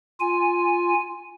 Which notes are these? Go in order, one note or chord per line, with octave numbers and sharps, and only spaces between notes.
F4 G#5